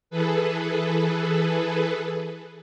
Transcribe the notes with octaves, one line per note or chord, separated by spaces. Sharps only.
E3 G#4 A4 B4